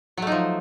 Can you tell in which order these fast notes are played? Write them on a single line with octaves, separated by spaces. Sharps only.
F#3 A3 D#4 F3